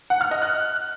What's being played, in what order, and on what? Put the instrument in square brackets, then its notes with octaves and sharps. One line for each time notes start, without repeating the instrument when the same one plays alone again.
[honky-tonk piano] F#5
F6
D#5
F#6